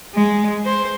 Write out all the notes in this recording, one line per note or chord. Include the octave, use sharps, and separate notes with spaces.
G#3
C5